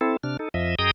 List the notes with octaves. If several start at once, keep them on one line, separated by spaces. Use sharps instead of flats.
C4 E4 A4
C3 D4 F6
D#4 A4
F2 F3 D#5 E5
F#2 G#4 D#5 G5 A#5 D#6